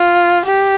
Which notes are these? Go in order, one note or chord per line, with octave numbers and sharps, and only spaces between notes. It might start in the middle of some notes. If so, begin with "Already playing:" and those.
Already playing: F4
G4